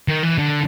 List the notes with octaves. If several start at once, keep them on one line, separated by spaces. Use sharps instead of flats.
D#3
E3
D3